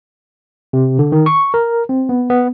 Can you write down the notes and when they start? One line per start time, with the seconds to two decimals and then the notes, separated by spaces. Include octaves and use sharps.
0.73 C3
0.99 D3
1.12 D#3
1.26 C#6
1.54 A#4
1.89 C4
2.09 B3
2.30 B3